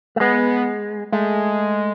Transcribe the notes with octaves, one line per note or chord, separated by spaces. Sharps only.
A3
G#3 B3
G#3 A3